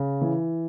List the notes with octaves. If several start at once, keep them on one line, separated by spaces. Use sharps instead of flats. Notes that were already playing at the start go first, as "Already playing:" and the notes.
Already playing: C#3
E3